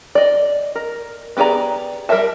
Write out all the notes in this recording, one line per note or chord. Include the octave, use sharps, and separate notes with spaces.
D5 D#5
A#4
B3 G4 G#4 D5 A#5
G3 A#4 C5 E5 A5